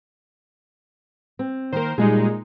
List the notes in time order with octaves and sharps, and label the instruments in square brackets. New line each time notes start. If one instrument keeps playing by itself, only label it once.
[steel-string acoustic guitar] C4
[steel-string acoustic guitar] D#3 A#3 [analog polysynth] A#4 C5
[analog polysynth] A#2 G#3 D#4 [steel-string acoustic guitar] G3 G#4